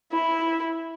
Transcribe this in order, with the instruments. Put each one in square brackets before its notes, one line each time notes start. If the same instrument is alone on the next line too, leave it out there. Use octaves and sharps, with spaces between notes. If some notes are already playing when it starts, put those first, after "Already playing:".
[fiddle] E4